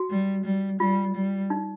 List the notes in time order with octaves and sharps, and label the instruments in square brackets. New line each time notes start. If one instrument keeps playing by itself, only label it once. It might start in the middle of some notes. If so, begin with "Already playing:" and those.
Already playing: [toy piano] F#4
[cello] G3
G3
[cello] G3 [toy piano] F4
[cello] G3
[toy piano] D#4